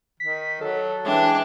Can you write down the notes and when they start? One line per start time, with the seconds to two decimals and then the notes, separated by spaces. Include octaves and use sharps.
0.20 D#3 B6
0.61 F#3 A4
1.05 E3 G#3 D4 E5 G5